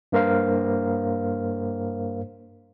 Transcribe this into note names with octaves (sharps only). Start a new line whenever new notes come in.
G2 A#3 A#4 C5 F5